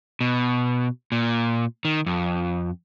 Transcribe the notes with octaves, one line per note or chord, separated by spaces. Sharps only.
B2
A#2
D#3
F2